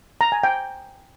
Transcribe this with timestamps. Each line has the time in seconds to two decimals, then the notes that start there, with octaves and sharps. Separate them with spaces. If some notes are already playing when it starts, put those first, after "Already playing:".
0.21 A#5
0.32 G#5
0.44 G5